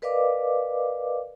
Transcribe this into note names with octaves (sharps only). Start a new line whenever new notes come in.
A#4 B4 D5 D#5 F5 D6